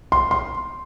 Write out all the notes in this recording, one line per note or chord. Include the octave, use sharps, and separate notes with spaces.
C6
C6